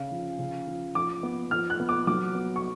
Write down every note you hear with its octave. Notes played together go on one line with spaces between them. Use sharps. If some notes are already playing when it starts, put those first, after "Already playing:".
Already playing: C#3 C#4 F5
F3
C#3
F3
F3 D6
B3
F3 F6
F#6
B3
D6
F#3 D6
B3
C#6